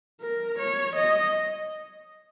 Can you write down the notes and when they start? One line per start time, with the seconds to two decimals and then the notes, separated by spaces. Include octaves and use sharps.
0.21 A#4
0.58 C#5
0.96 D#5